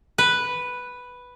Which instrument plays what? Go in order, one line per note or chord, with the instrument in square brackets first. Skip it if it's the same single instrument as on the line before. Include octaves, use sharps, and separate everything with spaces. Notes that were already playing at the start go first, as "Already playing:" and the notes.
[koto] B4